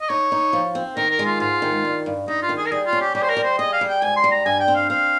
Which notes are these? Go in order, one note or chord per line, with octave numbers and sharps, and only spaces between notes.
D#5
D#4 C#5
D#4
F3
C4
D#3 A#4
A#4
G#3
F4
G#2 F4
D#3
G2
G2
G2 D#4
F4
D#3
G#4
A#4
G3 G#4
F4
C#4
G4
G3 G4
C5
A#4
G3
C5
G#4 D#5
F5
G3
G5
G#2 G#5
C6
G3
A#5
G2 G#5
G5
C4
F5
C4 F5